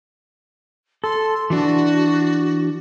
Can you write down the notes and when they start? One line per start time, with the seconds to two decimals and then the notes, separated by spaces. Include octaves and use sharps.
1.04 A4 C6
1.50 E3 D4 F#4